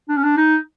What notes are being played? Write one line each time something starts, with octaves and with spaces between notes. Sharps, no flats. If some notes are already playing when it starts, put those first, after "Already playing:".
D4
C#4
D4
D#4